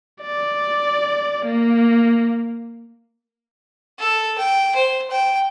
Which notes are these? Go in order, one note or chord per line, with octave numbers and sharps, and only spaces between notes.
D5
A#3
A4
G5
C5
G5